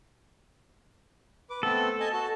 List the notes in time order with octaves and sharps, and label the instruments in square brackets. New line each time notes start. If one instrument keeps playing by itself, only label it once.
[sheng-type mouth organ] B4 D6
[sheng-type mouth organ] A3 B3 C4 [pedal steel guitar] A4
[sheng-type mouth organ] D#5 G#5 A5
F#4 A5